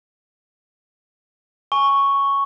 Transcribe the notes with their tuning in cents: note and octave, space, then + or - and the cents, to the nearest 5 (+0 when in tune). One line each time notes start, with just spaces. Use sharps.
G#5 +0 C#6 +0